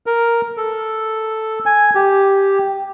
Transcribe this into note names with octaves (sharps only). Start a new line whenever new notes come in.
A#4
A4
G#5
G4